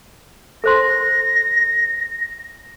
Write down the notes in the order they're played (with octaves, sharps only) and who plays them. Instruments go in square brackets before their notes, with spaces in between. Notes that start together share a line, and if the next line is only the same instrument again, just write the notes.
[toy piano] A4 C5 C6 [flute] A#6